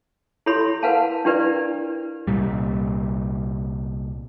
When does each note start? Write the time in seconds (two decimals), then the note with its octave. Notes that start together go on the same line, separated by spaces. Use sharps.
0.46 E4 G4 A4 C#5 B5 C6
0.83 A#4 B4 F5 F#5 G#5 A5
1.25 D4 E4 G4 A#4 B4 D5
2.27 C2 A#2 G3